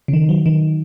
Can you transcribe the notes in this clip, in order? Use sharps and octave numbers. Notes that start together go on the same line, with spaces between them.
C#3
D#3
F#3
D#3